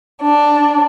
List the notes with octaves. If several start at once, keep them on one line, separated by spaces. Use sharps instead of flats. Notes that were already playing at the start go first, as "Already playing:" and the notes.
D4